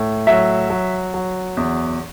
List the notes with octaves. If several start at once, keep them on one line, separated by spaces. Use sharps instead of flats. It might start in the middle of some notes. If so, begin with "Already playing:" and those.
Already playing: A2
F#3 E5
F#3
F#3
E2